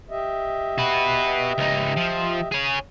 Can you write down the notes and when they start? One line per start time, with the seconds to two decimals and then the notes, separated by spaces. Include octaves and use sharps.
0.10 G4 D#5 E5
0.78 F#4 B4
1.58 C#2 D#4
1.97 F3
2.52 G#4 C#5